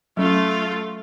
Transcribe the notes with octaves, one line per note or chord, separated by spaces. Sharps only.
F#3 A3 C#4 F4